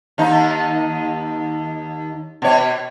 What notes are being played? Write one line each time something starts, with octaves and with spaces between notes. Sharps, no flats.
D#2 D#4
B2 C#5